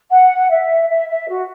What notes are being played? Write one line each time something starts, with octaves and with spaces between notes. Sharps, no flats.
F#5
E5
E5
E5
F#4